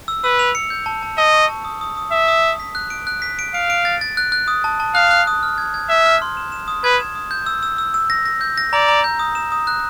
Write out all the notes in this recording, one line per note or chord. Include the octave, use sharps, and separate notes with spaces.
E6
B4 E6
F7
C#7
G6
A5
A5
D#5 A5
C#6
A5
D#6
D#6
D#6
E5 D#6
D#6
D#6
B6
F#6
D7
F#6
B6
D7
F5 D7
D7
A6
A6
F#6
F#6
D#6
A5
A5
F5 F#6
F#6
D#6
F6
G#6
G#6
E5 G#6
F6
C6
E7
E7
D#6
B4 G#6
E7
D#6
G6
E6
E6
E6
E6
A#6
A#6
G6
A#6
D5 A#5
A#5
G6
D#6
E7
D#6
F#6